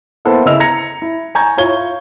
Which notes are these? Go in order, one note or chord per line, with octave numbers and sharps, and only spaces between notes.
A#3 B3 E4 A4 C5 F#5
C#3 E4 D#5 E6 F7
A#5 G#6 A#6 C#7 F7
E4
G#5 A#5 C#6 G6 G#6
E4 F4 C#5 C#6 G#6 G7